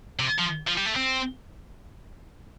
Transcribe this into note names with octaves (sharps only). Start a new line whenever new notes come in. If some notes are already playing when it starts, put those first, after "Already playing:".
C3
F3
F3
G3
A3
C4